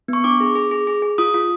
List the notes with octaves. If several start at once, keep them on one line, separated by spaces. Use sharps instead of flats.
B3 C#6
D4 D6
G#4
G#4
G#4
G#4
G#4
F4 D#6
F4